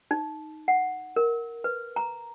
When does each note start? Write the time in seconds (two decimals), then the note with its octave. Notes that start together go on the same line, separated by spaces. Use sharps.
0.11 D#4
0.68 F#5
1.16 A#4
1.64 B4
1.96 A#5